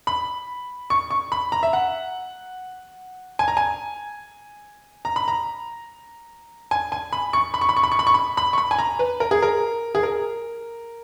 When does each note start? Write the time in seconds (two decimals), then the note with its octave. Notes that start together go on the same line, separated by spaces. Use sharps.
0.07 B5
0.90 C#6
1.11 C#6
1.32 B5
1.52 A#5
1.63 E5
1.73 F#5
3.39 G#5
3.48 A#5
3.57 G#5
5.05 A#5
5.16 B5
5.28 A#5
6.71 G#5
6.92 G#5
7.13 B5
7.33 C#6
7.54 B5
7.61 C#6
7.69 B5
7.77 C#6
7.83 B5
7.92 C#6
7.99 B5
8.07 C#6
8.14 B5
8.37 B5
8.53 C#6
8.58 B5
8.71 G#5
8.78 A#5
8.99 B4
9.20 A#4
9.31 G#4
9.42 A#4
9.95 G#4
10.03 A#4